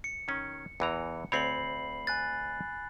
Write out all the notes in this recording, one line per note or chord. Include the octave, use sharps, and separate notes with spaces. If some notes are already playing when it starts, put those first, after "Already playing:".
C#7
D#3 C#4
E2 E3 A#5
D2 C4 C#5 B5 C7 F#7
G#5 F#6 A6